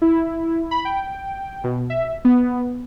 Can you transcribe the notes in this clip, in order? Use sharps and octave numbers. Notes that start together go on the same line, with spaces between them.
E4
B5
G5
B2
E5
B3